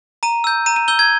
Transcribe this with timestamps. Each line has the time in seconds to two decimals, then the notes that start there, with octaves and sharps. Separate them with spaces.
0.23 A#5 D#7
0.44 E6 G6
0.66 A#5 D#7
0.76 D#7
0.88 E6 G6 G7
0.99 G#6